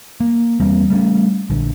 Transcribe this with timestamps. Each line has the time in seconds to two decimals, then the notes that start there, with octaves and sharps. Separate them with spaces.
0.20 A#3
0.60 E2 G3 A#3 C4
0.90 G3 A3 A#3 C#4
1.50 A#1 D3